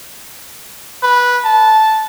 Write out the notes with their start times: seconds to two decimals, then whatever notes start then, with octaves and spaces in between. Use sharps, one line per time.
1.03 B4
1.44 A5